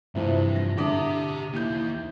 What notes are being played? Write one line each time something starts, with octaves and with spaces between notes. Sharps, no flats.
G2 C3 E3 F3
A#6
D3 G4 E5 D6 D#6
D#2 E3 A#3 G6